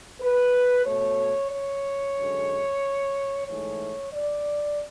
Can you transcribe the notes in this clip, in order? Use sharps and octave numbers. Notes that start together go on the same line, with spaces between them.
B4
B2 A3 C#5
C#5
F#2 D3 G#3
G#2 E3 A3 C#5
D5